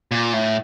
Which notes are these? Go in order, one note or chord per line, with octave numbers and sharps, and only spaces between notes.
A#2
A2